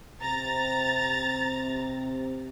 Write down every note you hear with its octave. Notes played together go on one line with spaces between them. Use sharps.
C3 A#5 A6